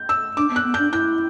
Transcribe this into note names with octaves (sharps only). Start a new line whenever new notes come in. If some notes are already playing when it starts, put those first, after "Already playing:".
Already playing: G6
E6
D4 D6
B3
F#6
B3
D4 G6
E4 G6